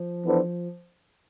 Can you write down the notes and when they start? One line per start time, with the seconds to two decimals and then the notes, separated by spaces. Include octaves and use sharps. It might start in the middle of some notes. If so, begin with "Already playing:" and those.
Already playing: F3
0.25 E3 B3 D4 A4 C5